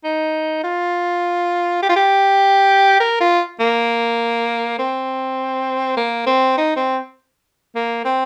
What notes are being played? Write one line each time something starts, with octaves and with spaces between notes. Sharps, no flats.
D#4
F4
G4
F4
G4
A#4
F4
A#3
C4
A#3
C4
D#4
C4
A#3
C4